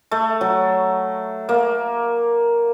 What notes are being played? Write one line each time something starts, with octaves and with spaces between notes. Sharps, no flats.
A3
F#3
A#3